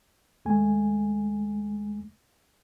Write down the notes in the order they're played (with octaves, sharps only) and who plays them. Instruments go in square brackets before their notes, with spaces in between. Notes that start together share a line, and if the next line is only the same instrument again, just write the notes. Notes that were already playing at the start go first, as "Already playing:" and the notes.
[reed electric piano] D#2 G#3 A3 G#5